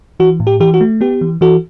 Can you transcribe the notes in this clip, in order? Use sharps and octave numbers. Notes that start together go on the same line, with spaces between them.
E3 F#4
A2
G4
E3 G4
F#4
A3
B3 G4
E3
E3 F#4 A4